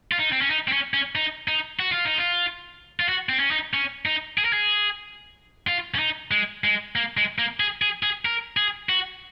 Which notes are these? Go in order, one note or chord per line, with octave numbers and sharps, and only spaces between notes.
F4
D#4
C4
C#4
D#4
C4
C#4
C#4
D#4
D#4
F#4
F4
D#4
F4
F4
F#4
C4
C#4
D#4
C#4
D#4
G#4
A#4
G#4
F4
C#4
D#4
G#3
G#3
A#3
G#3
A#3
G#4
G#4
G#4
A#4
G#4
F#4